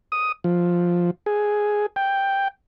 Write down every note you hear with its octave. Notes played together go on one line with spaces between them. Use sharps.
D#6
F3
G#4
G5